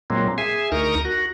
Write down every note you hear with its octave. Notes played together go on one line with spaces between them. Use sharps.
A#2 F#3 G#3 A#3 C4
G#4 E5 G#5
D2 D#4 A#4 A#5 C#6 D#6
F#4